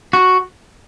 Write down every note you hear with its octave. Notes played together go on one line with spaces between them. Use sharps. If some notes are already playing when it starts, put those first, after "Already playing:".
F#4